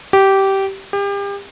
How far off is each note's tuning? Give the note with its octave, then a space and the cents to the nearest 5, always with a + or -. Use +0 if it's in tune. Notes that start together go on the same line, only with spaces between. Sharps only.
G4 -15
G4 +35